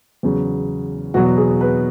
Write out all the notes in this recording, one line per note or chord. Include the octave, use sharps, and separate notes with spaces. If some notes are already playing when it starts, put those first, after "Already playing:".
E2 C#3 F#3
E2 B2 F#3 F#4
G#4
B4